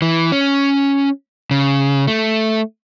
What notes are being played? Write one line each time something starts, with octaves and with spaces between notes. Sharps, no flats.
E3
C#4
C#3
A3